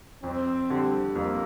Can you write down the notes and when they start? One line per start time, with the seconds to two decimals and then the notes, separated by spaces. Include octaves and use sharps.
0.23 F2 C4
0.70 D3 G3
1.15 F2 A#3